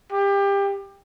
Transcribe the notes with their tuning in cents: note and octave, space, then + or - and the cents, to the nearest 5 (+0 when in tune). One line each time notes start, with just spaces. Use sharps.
G4 +25